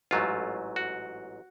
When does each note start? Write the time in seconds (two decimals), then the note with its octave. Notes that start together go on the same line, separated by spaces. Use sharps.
0.11 A1 G#2 F#3 A3 F4
0.76 F#4